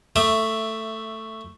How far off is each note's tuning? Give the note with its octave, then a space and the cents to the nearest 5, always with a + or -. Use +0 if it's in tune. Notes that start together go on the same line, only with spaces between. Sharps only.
A3 +10 E5 +0 D6 +35